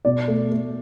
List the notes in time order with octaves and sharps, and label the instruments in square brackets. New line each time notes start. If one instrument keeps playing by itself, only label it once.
[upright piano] B2 D5
A3
A3